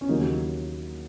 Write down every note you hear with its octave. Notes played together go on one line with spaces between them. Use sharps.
C#4
D#2 C#3 F#3 A#3 D#4